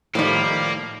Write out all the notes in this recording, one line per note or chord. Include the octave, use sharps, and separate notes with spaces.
A2 D#3 F3 G3 A#3